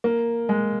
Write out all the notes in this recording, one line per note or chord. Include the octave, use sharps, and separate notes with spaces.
A#3
G#3